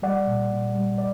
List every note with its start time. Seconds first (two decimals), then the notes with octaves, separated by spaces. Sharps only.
0.02 G3 D5 F#5
0.27 A#2
0.51 A#2
0.74 G3
0.98 D5